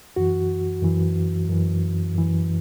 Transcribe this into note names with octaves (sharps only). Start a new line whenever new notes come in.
F#2 E3 F#4
F#2 E3
F#2 E3
F#2 E3